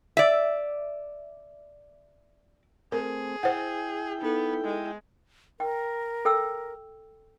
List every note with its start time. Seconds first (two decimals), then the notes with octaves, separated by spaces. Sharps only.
0.17 D5 E5
2.92 A3 C4 G#4 A#4
3.43 E4 C5 F#5 G5
4.22 B3 D#4 A4
4.65 G#3
5.60 A#4 G5
6.25 A4 G5 E6